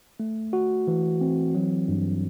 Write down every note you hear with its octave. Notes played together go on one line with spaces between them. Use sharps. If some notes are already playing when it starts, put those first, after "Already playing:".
A3
F#4
E3
C4
F#3
G2